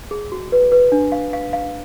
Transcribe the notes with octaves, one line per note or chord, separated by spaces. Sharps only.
G#4
F#4
B4
B4
D4
F5
F5
F5